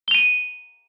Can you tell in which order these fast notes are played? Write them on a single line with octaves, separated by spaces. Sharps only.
G7 F7 D#7